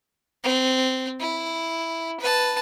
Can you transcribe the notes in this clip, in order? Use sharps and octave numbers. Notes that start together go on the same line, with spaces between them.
C4
E4
B4 A5